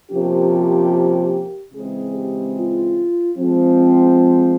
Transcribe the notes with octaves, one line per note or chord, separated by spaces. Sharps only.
C3 F3 A#3 C#4 G4
C#3 E3 G#3 C4 G#4
G4
F4
F3 G#3 C4